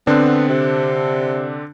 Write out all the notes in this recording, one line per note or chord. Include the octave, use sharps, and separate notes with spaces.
D3 B3 C4 D4
C3